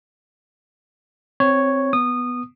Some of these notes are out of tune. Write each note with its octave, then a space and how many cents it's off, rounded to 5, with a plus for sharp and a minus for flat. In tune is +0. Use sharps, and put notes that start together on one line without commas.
C4 +0 C#5 +0
B3 +0 D#6 -20